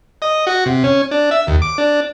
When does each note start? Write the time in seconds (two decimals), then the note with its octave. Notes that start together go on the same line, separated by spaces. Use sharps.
0.22 D#5
0.47 F#4
0.66 C3
0.84 C#4
1.11 D4
1.31 E5
1.47 D#2
1.62 D6
1.78 D4